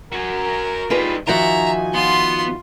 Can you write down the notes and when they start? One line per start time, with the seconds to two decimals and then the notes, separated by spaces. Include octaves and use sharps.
0.12 F#4 A#4 G#5
0.90 G3 D#4 F4 G#4 B4
1.27 D#3 F3 D#4 F#4 E5 G#5 A#5
1.94 B3 F4 C6